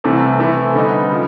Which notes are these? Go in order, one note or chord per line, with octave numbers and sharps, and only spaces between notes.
C2 C3 E3 A3
C3 E3 A3 C4 E4
D3 G3 B3 D#4
C#3 F3